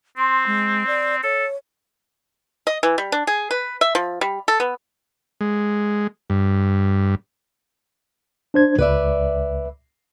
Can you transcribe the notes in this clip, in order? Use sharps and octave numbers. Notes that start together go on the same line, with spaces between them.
C4 C6
G#3
D5
A4 C#5
D#5
E3
G3
D4
G#4
B4
E5
F3
G3
A4
B3
G#3
G2
D4 C5 G#6
C#2 B4 D5 E5